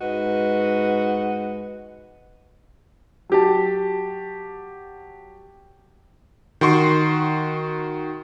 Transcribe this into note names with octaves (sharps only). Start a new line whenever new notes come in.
G#2 F#4 B4 D#5
F#3 G4 A5
D#3 F#4 C6 C#6